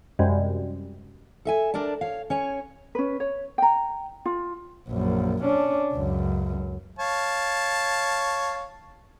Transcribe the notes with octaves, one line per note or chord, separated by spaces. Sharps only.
F#2 C3 G3 G#3
A4 E5 G#5
D4 A#4 D5 A5
C#5 F5
C#4 C#5 G#5
C#4 B4
C#5
G5 A#5
F4
A#1 F#2
C#4 D4
C#2 F#2
C#5 F5 A5